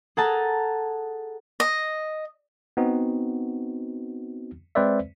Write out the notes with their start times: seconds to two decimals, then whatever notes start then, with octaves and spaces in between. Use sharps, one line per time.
0.17 G#4 A4 F#5 A5 A#5
1.60 D#5
2.77 B3 C4 D#4 F#4
4.75 G#3 C4 B4 C5 D5 E5